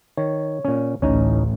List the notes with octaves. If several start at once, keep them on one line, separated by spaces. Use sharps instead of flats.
D#3 C#5
A#2 C#4
A1 D2 C#4 D#4 D#5